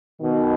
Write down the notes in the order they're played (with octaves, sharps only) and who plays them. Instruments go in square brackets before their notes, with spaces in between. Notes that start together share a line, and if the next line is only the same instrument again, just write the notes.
[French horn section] B2 D#3